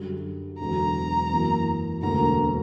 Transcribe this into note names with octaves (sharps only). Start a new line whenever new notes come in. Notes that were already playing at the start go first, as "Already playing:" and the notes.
Already playing: F#2 D3 G3
E1 E2 D3 F#3 A#5
F#2 E3 A#3
E1 D2 D3 A#3 A#5